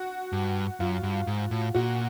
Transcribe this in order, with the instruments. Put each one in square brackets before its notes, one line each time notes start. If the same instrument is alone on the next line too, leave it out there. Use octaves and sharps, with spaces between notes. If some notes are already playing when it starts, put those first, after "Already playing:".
Already playing: [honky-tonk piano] F#4
[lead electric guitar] G2
[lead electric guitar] F#2 [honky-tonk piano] F4
[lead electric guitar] G2
G#2
A2
[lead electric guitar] A#2 [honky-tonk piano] F#4